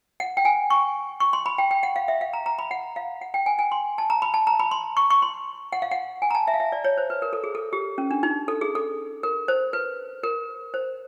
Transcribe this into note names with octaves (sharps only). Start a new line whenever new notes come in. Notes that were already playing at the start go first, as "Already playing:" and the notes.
F#5
G5
G#5
C#6
C#6
C6
B5
G5
G5
F#5
F5
E5
F5
A#5
A#5
B5
F#5
F5
F#5
G5
G#5
G#5
C6
A5
A#5
B5
A5
A#5
B5
C6
C#6
C#6
C6
F#5
F5
F#5
G#5
A#5
A5
E5
F5
E5
D5
C#5
C5
B4
A#4
A4
G#4
A4
G4
C#4
D4
D#4
A4
G#4
A4
A#4
C5
B4
A#4
C5